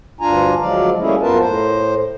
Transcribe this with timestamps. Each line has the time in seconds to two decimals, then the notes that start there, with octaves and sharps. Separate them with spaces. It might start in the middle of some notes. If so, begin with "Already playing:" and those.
0.21 D2 G2 D4 F4 G#5 A#5
0.60 D2 F3 F#3 G#3 D5 F5
0.99 G3 A3 A#3 C#4 E4 G#4
1.22 F#2 B3 F4 A#4 B4 A5
1.39 A2 C5